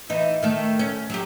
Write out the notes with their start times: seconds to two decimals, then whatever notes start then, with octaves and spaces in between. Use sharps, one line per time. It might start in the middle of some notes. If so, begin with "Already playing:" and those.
0.10 E3 D#4
0.43 D#3 A3
0.79 C#4
1.10 F#3 G4